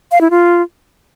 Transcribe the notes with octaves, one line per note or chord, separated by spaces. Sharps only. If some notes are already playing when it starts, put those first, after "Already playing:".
F5
E4
F4